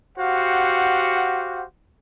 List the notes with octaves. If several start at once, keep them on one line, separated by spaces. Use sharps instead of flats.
F#4 G4 C5 F5 F#5